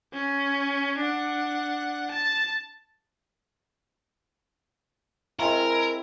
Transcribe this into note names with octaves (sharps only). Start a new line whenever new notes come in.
C#4
D4 F#5
A5
G#3 C4 E4 A#4